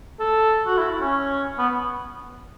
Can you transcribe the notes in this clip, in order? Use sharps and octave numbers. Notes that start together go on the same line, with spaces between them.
A4
F#4
E4
C#4
B3